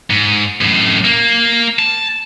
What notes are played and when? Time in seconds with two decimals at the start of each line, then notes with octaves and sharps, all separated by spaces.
0.10 G#2
0.61 F#2 A2
1.05 A#3
1.79 A5